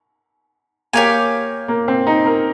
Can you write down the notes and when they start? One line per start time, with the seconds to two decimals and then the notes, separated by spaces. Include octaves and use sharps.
0.93 A#3 G4 C#5 F5 G#5
1.68 A#3
1.88 C4
2.07 D#4
2.26 A#4